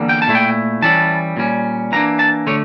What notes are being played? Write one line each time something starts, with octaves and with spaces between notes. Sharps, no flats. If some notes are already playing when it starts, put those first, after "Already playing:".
Already playing: E2 D3 G3 A#3
G5
A5
A#2 A3 E4
G5
E3 G3 C#4 E4 A5
A#2 G3 C#4
E3 A#3 D4 A#5
A5
D3 A3 C#5